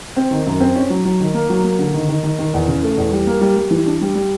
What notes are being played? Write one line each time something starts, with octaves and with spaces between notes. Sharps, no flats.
C4
D#3
F#2
C4
C#4
F#3
F#3
D#3
A#3
F#3
A#3
D3
D#3
D#3
D#3
D#3
E2
C#3
A3
E2
G3
A#3
G3
G3
E3
D4
G3
G3